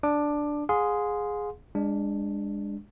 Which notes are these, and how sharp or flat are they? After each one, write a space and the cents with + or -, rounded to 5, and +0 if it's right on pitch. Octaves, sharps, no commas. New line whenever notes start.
D4 +0 D6 +15
G#4 +0 F5 +45 C6 -10
G#3 -25 D4 +0